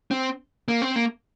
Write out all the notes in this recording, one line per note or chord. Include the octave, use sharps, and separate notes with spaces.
C4
A#3
C4
A#3